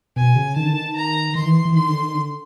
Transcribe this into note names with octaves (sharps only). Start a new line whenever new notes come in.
B2 G#5
C#3
D#3 A5
D3
D#3
A#5
D#3 C6
E3
E3
D#3 C6
D3
D#3
D3